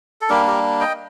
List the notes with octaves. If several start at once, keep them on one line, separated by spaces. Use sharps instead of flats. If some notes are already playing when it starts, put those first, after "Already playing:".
A4
G3 A#3 D4 G4 A#4
G4 A#4
D#5 G5